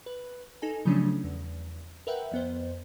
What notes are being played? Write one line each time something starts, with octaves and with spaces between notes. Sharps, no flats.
B4
D#4 A4 G#5
C#3 F3 F#3 A3 C#4 D4
E2
A#4 B4 E5 F#5 G5
F2 B3 C5